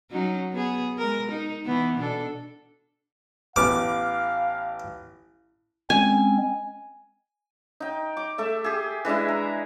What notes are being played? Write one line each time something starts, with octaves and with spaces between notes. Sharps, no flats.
F#3 C#4 D#4
B3 G#4
G#3 A#4
D#4
E3 B3
B2 D4 A4
A1 B3 F5 D6 F6
G#3 C4 C#4 G#5
D#4 G5
D6
A3 A4 E5
G4 G#4
E3 G#3 D4 E4
A#5